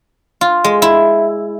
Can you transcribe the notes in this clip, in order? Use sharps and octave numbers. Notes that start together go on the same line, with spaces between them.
F4
G#3
E4